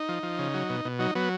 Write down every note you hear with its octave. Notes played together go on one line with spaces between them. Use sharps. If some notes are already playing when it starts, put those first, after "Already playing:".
Already playing: D#4
F3
F3
C#3
F#3
B2
B2
F#3 D#4
F#3 B3